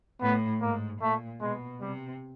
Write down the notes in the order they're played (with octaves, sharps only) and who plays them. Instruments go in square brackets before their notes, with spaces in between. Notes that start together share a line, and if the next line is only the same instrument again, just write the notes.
[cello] A2 [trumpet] B3
[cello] G#2 [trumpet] A#3
[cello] A#2 [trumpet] A3
[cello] B2 [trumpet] G#3
[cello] C3 [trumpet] G3